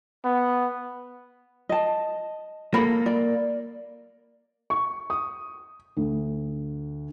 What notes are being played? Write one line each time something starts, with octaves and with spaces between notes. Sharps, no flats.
B3
D#5 A5
A#3 A4 B5
D5
C#6
D#6
D2